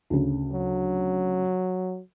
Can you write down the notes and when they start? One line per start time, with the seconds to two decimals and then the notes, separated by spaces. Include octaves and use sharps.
0.10 D2 C#3
0.53 F#3